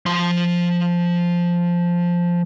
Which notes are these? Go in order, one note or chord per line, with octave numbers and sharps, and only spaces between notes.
F3 C6